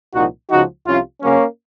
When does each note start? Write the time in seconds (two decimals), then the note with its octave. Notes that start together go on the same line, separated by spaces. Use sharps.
0.14 C2 A#2 F3 D#4 F#4
0.50 C#2 C#3 F3 D#4 F#4
0.86 C2 C3 F3 C#4 F4
1.22 F#2 C#3 F#3 A#3 C#4